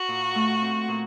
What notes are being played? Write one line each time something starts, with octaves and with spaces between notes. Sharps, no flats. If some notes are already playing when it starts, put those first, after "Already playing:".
Already playing: F#4
A#2
A3
C4
A#2